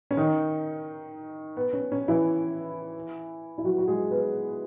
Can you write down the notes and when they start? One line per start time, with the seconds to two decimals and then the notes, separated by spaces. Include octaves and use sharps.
0.11 C#4
0.17 D#3 D#4
1.57 B3
1.73 C#4
1.92 C#4
2.08 E3 E4
3.58 E4
3.64 F#3 F#4
3.78 F#4
3.88 G#3 G#4
4.11 B3 B4